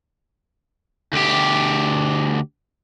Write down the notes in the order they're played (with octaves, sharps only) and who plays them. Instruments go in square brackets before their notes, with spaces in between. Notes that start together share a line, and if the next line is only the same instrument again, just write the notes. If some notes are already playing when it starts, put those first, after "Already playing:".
[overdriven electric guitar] D2 G4